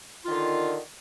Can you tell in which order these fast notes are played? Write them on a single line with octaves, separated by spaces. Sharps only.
F4 D#3 D3